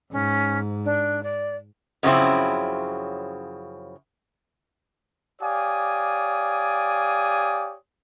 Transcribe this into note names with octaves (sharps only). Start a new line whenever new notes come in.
G#2 C#4
D4
D5
F#2 C#3 F3 C4 E4
G4 C#5 D5 F5 G#5 D#6